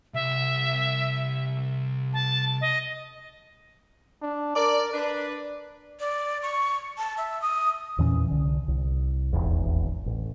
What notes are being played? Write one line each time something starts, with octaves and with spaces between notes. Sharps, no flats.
C2 E5
A5
D#5
D4
A#4 D5
D4 B4 D5
D5
C#6
A5
E5
D#6
E2 A#2 E3 C#4
C2 D3
C2
D#1 G#1 E2
A1